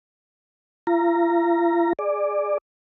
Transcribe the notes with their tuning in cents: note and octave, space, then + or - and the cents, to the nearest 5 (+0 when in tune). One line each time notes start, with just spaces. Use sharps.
F4 -45 A#5 +0
G#4 +0 D5 +15